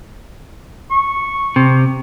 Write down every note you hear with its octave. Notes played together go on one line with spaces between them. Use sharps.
C#6
C3